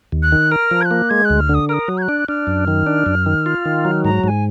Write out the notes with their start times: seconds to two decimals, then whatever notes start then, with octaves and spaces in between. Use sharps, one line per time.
0.12 D#2
0.23 F#6
0.32 D#3
0.51 A#4 F6
0.71 F3
0.81 G#6
0.85 F#6
0.91 A#3
1.10 G#3 G#6
1.25 D2 F#6
1.40 F6
1.49 D3
1.54 D#6
1.69 A#4 F6
1.73 D#6
1.88 F#3
1.98 G#6
2.02 F#6
2.09 D4
2.29 D4 F6
2.47 F#2
2.68 D#3
2.87 D4
3.06 F#2
3.26 D#3
3.46 F4
3.65 D#3
3.85 F#3
4.04 G#2 A#5
4.24 G#2 A#5
4.28 G#5